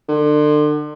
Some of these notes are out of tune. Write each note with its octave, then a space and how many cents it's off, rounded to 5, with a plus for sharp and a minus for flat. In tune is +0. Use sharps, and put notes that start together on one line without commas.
D3 +35